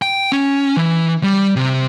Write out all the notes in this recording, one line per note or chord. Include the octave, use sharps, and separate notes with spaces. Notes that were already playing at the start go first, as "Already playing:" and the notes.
G5
C#4
E3
G3
C3